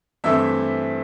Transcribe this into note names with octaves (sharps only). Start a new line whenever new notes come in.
G2 E3 A3 C4 E4 E5